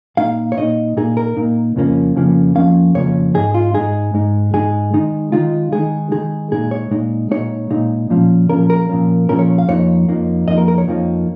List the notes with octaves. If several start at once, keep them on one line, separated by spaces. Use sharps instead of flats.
A#2 A#3 D#4 F5
C#5
A#2 A#3 D#4 D#5
A#2 A#3 D#4 G#4
A#4
A#2 A#3 D#4
F2 C#3 F3 A#3 C#4
F2 C#3 F3 A#3 C#4
F2 C#3 F3 A#3 C#4 F5
F2 C#3 F3 A#3 C#4 C#5
G#2 G#3 D#4 G#4
F4
G#2 G#3 D#4 G#4
G#2 G#3 D#4
G#2 G#3 D#4 G#4
D#3 G#3 D#4
D#3 G#3 D#4 F4
D#3 G#3 D#4 G#4
D#3 G#3 D#4 G#4
A#2 G#3 D#4 G#4
C#5
A#2 G#3 D#4
A#2 G#3 D#4 C#5
A#2 G#3 D#4
A#2 F3 C#4
A#2 F3 C#4 A#4
A#4
A#2 F3 C#4
A#2 F3 C#4 A#4
C#5
F5
F2 F3 A#3 D#4 C#5
F2 F3 A#3 D#4
F2 F3 A#3 D#4 D#5
A#4
A#4
C#5
F2 F3 A#3 D#4